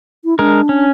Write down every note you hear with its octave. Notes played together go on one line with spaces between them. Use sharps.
E4
G#3 D4 A#4
C#4